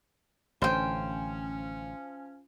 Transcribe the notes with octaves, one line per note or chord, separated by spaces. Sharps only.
A1 D3 F3 C#4 C5 G5